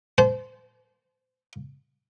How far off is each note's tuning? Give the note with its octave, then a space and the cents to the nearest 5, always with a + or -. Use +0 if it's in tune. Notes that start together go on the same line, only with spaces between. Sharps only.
C5 -25 A5 -45